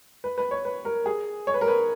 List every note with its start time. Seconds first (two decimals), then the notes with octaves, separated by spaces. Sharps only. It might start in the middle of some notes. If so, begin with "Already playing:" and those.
0.24 B4
0.38 B4
0.51 C#5
0.65 B4
0.85 A#4
1.06 G#4
1.47 C#5
1.54 B4
1.61 A#4
1.68 B4